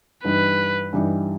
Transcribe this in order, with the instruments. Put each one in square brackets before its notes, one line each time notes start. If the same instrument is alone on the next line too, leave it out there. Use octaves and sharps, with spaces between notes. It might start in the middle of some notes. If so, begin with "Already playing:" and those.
[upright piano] G2 E3 G3 D#4 [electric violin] B4
[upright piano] G2 E3 G3 D#4